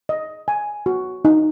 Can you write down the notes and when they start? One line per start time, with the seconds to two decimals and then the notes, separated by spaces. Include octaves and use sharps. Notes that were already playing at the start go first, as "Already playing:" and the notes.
0.09 D#5
0.48 G#5
0.86 F#4
1.25 D#4